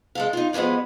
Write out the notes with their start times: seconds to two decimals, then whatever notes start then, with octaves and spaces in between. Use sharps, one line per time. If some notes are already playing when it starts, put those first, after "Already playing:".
0.15 G#3 A4 F5
0.33 D#4 F4
0.53 G2 E3 F3 G#3 B3